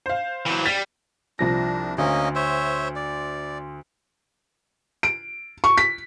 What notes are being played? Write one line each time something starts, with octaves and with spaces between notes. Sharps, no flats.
C5 F5
E3 F#3
G3 A6 B6
C2 F3 D4 A#6
D2 A#3 C#4 D#5
C5 C#5 E5
D5
D7
C#6
B6